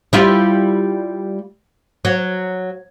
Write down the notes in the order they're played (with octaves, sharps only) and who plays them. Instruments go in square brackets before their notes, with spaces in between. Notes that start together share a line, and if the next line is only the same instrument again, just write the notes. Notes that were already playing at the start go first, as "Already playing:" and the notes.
[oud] G3 E4 F4
F#3